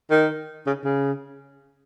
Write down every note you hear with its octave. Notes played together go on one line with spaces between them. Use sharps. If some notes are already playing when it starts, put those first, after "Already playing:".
D#3
C#3
C#3